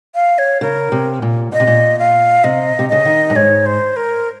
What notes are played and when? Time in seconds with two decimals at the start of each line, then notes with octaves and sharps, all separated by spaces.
0.15 F5
0.38 C#5
0.61 C#3 A#4
0.92 C3
1.22 A#2
1.52 A#2 D#5
1.60 C3
1.67 A#2
1.99 F5
2.44 C3 D#5
2.79 C3
2.89 C#3 D#5
3.05 D#3
3.30 G2
3.35 G#2 C#5
3.66 C5
3.96 A#4